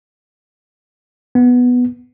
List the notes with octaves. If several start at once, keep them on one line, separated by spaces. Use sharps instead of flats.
B3